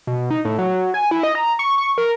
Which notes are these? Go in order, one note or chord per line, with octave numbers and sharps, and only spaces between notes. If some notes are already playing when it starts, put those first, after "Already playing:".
B2
D#4
A2
F#3
G#5
E4
D#5
A#5
C#6
C#6
A#4